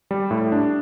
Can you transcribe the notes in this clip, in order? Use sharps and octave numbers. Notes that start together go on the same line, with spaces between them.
G3
A2
D4